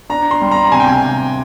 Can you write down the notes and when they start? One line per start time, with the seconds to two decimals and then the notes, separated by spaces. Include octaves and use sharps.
0.09 D4 A#5
0.31 C6
0.42 G3
0.51 A#5
0.72 C3 G#5
0.80 G5
0.87 G#5